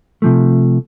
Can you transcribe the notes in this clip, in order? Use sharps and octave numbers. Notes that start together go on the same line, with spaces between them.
C3 F3 A3